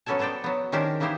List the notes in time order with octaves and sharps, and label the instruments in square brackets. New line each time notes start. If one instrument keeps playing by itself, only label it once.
[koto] F#3 B3 C#4 A4 G#5 A5
B3 A4 C5 D5 G5
F#3 B3
D#3 C#4 D4 G4 A#4 C5
E3 A#3 D#4 E4 G4 C5